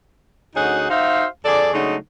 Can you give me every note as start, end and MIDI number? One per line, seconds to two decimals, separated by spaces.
0.56 0.89 38
0.56 0.89 61
0.56 0.89 63
0.56 0.89 66
0.56 0.89 68
0.56 0.89 78
0.90 1.26 63
0.90 1.26 66
0.90 1.26 72
0.90 1.26 76
0.90 1.26 77
1.45 1.72 41
1.45 1.72 68
1.45 1.72 69
1.45 1.72 74
1.73 1.96 49
1.73 1.96 54
1.73 1.96 56
1.73 1.96 57
1.73 1.96 62
1.73 1.96 63